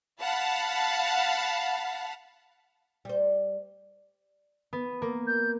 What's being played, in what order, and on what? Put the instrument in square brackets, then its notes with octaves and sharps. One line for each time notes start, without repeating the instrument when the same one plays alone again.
[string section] F5 F#5 A5 B5
[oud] G3 C5
[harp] B3
A#3
[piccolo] G6